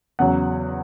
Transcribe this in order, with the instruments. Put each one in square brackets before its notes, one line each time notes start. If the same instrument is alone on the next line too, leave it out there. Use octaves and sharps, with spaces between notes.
[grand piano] E2 C#3 F#3 F#5